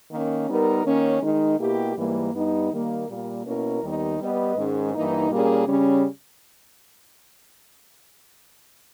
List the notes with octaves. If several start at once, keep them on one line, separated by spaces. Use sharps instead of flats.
D#3 A#3 C#4
G3 B3 D#4 A#4
D#3 A#3 C#4
D#3 G#3 D#4
B2 A#3 E4 G4
G#2 E3 G3 A#3
G2 G3 B3 D#4
D#3 G3 A#3
A#2 G3 A#3
B2 A#3 C#4 E4 A#4
D#2 D#3 G3 B3 D#4
G3 B3 G4 B4 D#5
G#2 D#3 G#3 C#4
G2 E3 A#3 D#4
A#2 G3 A#3 C#4 G#4
C#3 G3 C#4